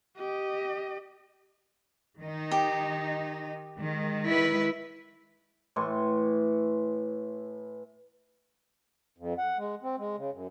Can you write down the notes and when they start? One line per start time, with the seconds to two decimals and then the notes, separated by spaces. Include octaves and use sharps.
0.17 G4 D#5
2.19 D#3 D#4
2.51 G4
3.78 D#3 G#3
4.26 E4 B4
5.76 A2 E3 C6 C#6
9.18 F2
9.38 F#5
9.58 G#3
9.83 C4
9.98 G#3
10.17 C#3
10.32 F#2